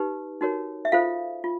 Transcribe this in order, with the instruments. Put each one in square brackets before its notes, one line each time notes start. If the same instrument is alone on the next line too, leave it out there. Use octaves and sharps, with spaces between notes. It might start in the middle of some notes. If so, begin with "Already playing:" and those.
Already playing: [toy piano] D#4 G4 B4
D#4 F#4 A#4 C#5
E5
F4 A4 C5 F5
F4